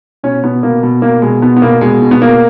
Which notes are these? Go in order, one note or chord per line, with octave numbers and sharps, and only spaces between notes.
B2 C#4
B2 B3
B2 A#3
B2
B2 A#3
B2 G#3
B2 B3
B3
B2 A#3
B2 G#3
B2
B3
B2 A#3